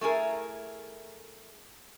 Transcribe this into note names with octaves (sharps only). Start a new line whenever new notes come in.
A3 E4 G#4 A#4